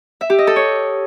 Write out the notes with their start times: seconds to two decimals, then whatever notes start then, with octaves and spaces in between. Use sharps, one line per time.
0.21 E5
0.30 G4
0.38 D#5
0.47 A4
0.56 C#5